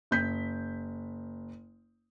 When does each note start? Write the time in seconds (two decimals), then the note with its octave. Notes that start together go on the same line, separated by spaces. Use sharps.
0.11 F#1 G6 B6